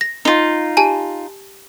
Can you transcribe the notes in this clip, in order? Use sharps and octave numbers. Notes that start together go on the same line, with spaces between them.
A#6
D#4 F4
G4 G#5 A5